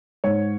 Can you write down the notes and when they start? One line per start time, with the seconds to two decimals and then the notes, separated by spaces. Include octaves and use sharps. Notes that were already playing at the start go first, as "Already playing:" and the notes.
0.24 G#2 C#5